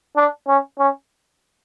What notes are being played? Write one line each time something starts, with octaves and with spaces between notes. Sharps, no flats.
D4
C#4
C#4